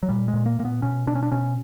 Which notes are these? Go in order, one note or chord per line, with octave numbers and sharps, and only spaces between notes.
F#3
A#2 G3
G#3
A#2
A#3
A#2 A#3
B3
B2 C#4
B2 D4
C#4
D4
B2 C#4